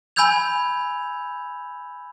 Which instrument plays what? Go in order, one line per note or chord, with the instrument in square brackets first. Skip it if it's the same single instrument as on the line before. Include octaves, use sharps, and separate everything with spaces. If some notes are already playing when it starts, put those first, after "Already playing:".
[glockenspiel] G#5 B5 E6 G6 G#6 F7